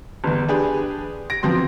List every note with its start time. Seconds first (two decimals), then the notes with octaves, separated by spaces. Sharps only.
0.24 G1 E2
0.48 D4 G4 G#4 B4
1.30 A#6 D7
1.43 E2 F3 F#3 C4 C6